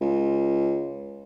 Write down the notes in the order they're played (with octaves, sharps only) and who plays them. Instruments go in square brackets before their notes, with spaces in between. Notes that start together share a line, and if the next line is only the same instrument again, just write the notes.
[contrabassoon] C#2